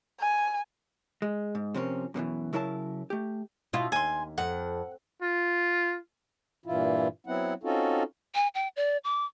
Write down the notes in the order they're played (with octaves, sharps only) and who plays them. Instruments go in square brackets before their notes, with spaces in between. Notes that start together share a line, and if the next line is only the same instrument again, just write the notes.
[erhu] G#5
[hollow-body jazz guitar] G#3
G#2
C3 F3 C4 C#4 A#4
F#2 B2 D3 E3
C#3 F#3 E4 A#4 D#5 A5
A3 G4
[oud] B2 E4 F4
[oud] D#2 [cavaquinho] G#5 C6
[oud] F2 [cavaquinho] F#5
[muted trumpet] F4
[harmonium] G2 A#2 E3 E4 F4
F#3 B3 C4 E4 F#5
C4 C#4 D#4 F4 F#4 A4
[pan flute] G#5
G5
D5
D6